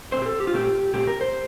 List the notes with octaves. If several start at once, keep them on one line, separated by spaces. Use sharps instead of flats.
A#2 A3 C4 C5
G4
A4
G4
F4
A#2 A3 C4 G4
A#2 A3 C4 G4
A#4
C5